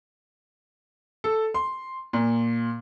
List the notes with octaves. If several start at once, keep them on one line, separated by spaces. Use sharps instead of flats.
A4
C6
A#2